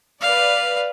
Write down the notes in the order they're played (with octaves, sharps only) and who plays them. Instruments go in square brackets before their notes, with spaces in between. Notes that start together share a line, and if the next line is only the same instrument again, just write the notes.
[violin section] B4 D5 [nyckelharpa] F5